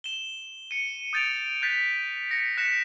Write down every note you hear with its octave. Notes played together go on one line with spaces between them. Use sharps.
E7 G7
C#7 D#7
D#6 G6 A6 D7 F7
F#6 G6 A6 B6
A#6 B6 C#7
F#6 A#6 B6 C#7 E7